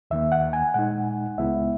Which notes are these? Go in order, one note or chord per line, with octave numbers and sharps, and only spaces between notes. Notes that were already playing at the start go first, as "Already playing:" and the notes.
D#2 D#3 A#3 E5
F#5
G#5
A#2 G#3 D#4 F#5
C#2 C#3 G#3 B3 E4 E5